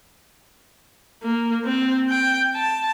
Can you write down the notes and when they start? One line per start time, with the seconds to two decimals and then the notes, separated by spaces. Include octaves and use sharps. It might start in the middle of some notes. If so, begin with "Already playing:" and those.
1.23 A#3
1.65 C4
2.09 G5
2.55 A5